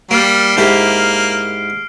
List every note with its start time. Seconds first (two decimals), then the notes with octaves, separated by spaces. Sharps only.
0.11 G3 A#3 F6 C7 D7
0.57 G#2 A#3 E4 G4